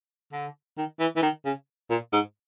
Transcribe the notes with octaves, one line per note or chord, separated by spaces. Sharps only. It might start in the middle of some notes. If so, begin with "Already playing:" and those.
D3
D#3
E3
E3
D#3
C#3
A#2
G#2